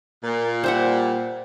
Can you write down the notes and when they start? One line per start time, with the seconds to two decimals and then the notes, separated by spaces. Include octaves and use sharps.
0.24 A#2 A#4
0.64 G3 C5 E5 F#5